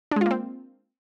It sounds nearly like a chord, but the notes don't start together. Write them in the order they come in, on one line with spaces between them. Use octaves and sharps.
D4 G#3 F4 A#3 C4